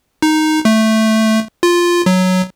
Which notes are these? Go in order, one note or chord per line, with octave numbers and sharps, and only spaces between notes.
D#4
A3
F4
F#3